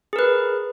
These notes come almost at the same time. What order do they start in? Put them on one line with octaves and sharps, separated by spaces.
G#4 A#4 B4